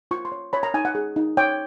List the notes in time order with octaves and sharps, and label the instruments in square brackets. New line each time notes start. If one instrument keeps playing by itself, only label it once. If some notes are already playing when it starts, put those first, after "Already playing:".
[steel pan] F4 C#6
C6
C#5
C#5 B5
A#5
D#4 G#5
F#5
G#4
D#4
C#5 G5